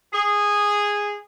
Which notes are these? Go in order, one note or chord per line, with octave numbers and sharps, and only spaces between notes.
G#4